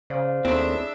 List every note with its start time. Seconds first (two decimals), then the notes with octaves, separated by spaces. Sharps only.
0.10 C#3 C5 D5 F5
0.45 D#2 A3 C4 D4 E4 G#4 C#5 E5